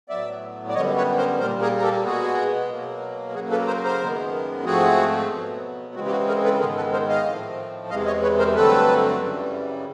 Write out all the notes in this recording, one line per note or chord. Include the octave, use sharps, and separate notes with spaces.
A2 F#3 B3 D5 E5
D5
F#2 D3 G3 B3 C#5 D#5
B4 C#5
A#4 C5
A#2 G3 A#3 A#4 C5
G#4 A#4
A#4
G4 A4
B2 G#3 B3 F#4 G#4
B2 F#3 A#3
C#3 F#3 A#3 F#4 G#4
A4 B4
A#4 C5
A#4 C5
F#2 D#3 G#3 B3
G#2 F3 A3 C4 F#4 G#4
B2 F#3 B3
C#3 E3 G#3 C4 F#4
G4
F#4
G#4 A#4
A4 B4
G#2 D#3 G#3 B3 G#4 A#4
A4 B4
A#4 C5
D#5 F5
A2 F3 A3 C4
E2 C3 E3 G#3 D#5 F5
C#5 D#5
B4 C#5
A#4 C5
G2 D3 F#3 A3 C4 A4 B4
F#2 C#3 E3 G3